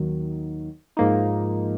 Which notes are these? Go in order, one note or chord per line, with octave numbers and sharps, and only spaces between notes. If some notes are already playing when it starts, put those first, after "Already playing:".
Already playing: D#2 D#3 F#3
G#2 F3 A#3 D#4